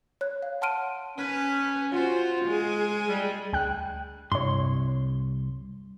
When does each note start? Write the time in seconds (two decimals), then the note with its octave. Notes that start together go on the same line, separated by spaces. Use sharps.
0.21 C#5 F#6
0.42 F5
0.62 F#5 A5 C6 F6 D7 D#7
1.18 C#4 B4
1.92 F4 F#4 C5
2.45 G#3 G#4
3.08 G3
3.53 D2 G5 F#6
4.32 C2 G2 C#5 C6